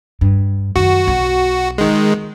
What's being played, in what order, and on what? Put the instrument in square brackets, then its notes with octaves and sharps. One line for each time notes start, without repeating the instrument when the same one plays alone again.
[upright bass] G2
[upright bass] F#2 D#3 [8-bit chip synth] F#4
[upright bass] B1
[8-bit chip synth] D#3 G#3